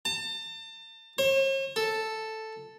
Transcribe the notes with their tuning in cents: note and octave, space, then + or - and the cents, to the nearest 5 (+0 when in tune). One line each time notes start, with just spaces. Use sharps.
A5 +35
C#5 -45
A4 +0